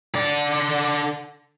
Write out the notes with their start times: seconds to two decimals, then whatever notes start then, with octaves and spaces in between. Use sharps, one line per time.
0.15 D3 D5